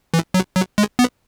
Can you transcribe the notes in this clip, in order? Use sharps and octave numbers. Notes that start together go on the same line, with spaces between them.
E3
F#3
F#3
G#3
B3